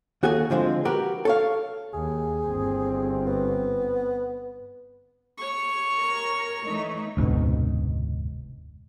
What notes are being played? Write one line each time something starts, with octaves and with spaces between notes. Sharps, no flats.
D#2 F#4 G#4 A4 G#5
D3 F3 G#3 C4
F#4 G4 A#4 B4
A4 C#5 F5
D#2 G#4
G1 C4
B3
C#5 C#6
A#4
E3 A3 D#4
F1 D2 G#2 B2